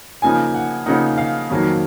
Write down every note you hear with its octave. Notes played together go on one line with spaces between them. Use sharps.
C#3 F3 A#3 D#4 G#5
F#5
C#3 F3 A#3 D#4 F#5
F5
F2 D#3 F#3 A#3